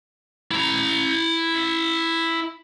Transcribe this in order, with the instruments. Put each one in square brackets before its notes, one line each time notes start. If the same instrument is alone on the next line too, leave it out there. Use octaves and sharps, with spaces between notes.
[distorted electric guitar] E4 A#5